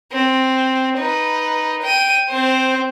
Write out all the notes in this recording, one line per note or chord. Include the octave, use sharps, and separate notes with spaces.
C4
D#4 B4
G5 D#7
C4 C5